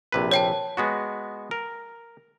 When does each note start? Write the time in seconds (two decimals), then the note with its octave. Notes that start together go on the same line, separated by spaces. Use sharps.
0.12 A#1 C3 B4
0.31 C#5 G5 A5
0.77 G#3 B3 F#4
1.51 A#4